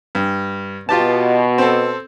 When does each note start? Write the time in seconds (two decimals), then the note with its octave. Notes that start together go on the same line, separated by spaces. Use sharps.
0.15 G2
0.89 B2 F4 G4 A5
1.58 C4 A4